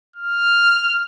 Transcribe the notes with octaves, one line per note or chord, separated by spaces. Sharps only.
F6